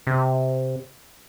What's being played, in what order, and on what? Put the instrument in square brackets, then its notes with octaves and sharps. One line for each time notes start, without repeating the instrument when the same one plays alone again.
[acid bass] C3